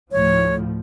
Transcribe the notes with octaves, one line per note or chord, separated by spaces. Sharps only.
D2 A2 F3 C#5